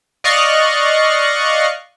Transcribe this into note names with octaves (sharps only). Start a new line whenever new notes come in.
D5 D#5 F5 C#6 F6 F#6